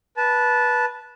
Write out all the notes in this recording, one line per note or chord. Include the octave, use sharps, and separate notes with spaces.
B4 A5